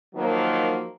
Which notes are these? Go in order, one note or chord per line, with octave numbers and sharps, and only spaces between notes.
D#3 F3 F#3 A#3